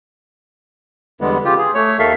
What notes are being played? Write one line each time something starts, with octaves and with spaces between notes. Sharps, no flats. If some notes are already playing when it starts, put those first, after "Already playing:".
E2 D3 G3 G#3 B3
C#3 F4 G4
G#4
A3 C#5
D#2 D#3 A4 E5 F5